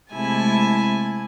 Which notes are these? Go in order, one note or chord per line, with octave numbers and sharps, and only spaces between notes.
C3 G#3 A3 E4 G#5 A5